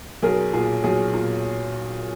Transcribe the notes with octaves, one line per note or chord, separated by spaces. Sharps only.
B1 G#4 A#4
A#2 G#4
B1 G#4
A#2